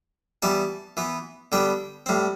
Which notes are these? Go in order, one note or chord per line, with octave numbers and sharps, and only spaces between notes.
E3 G3 B3 A5
E3 B3
D3 G3 B3 G5
A2 G3 C4